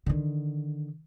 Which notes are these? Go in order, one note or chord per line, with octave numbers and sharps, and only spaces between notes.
D3 D#3